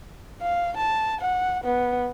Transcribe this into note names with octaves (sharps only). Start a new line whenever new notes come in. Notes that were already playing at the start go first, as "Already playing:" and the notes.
F5
A5
F#5
B3